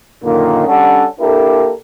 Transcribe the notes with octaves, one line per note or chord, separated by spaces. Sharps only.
F#2 A#2 D3 D#3 A#3 D#4
G3 C#4 D4 A4 F#5
A#3 D4 E4 G4 A4 A#4